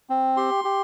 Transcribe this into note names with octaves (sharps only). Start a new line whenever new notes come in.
C4
G4 C6
G4